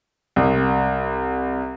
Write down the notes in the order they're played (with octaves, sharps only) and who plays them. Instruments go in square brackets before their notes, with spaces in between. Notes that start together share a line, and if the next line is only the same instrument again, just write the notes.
[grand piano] C2